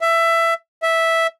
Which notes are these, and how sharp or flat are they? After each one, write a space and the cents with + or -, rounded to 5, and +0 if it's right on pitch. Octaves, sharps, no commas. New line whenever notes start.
E5 +15
E5 -5